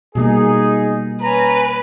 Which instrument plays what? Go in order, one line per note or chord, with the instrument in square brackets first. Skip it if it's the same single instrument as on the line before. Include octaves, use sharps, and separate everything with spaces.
[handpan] B2 G3 A#3 [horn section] D#4 G#4
[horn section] C#4 G#5 A#5 [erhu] B4